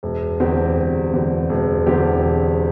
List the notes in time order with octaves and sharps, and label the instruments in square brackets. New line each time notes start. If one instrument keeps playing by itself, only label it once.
[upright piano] E1
E2 D3 C4 G4
E1
E2 D3 C4 G4
E1
E2 D3 C4 G4
E1